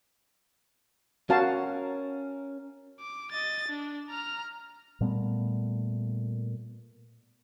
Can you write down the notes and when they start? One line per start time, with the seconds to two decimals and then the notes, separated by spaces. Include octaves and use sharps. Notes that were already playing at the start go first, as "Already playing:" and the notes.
1.30 C#4 F#4 A#4 F5 A5
3.00 D6
3.32 D#5 A6
3.68 D4
4.10 A#5 F6
5.01 A#2 G3 A3 B3